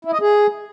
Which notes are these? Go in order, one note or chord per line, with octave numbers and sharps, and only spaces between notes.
E4
D#5
G#4